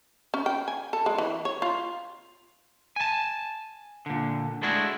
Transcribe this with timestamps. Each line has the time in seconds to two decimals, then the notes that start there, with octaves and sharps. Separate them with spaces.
0.34 C#4
0.46 G5
0.68 G#5
0.93 A4
1.06 G#3
1.18 E3
1.45 C#5
1.62 F4
2.96 G#5 A5
4.06 A#2 D3
4.62 G#3 A3 D4 E4 F#4 G#4